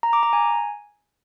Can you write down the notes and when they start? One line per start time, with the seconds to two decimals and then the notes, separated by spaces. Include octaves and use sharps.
0.03 A#5
0.13 D6
0.23 A#5
0.33 G#5